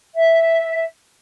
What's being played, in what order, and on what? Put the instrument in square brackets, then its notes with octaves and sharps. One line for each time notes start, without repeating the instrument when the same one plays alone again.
[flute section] E5